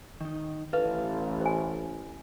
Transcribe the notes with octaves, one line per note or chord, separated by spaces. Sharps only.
D#3 D#4
A1 A4 B4 F5
C5 G#5